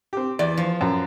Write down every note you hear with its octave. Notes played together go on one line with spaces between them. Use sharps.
C4 G4
E2 D5
F3
F#2